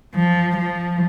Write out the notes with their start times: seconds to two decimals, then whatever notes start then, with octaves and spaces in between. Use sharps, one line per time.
0.15 F3
0.57 F3